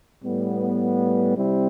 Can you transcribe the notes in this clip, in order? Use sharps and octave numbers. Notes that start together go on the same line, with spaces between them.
A2 G3 B3
C3 G3 C4 E4